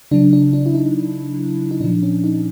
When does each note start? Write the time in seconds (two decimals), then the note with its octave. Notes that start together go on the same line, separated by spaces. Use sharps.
0.11 C#3 F#3 D4
0.33 D4
0.53 D4
0.66 E4
0.75 D#4
1.71 D#4
1.81 A#2 F3 D4
2.03 C#4
2.24 D#4